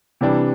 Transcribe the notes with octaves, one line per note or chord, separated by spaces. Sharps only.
C3 E3 G3 D4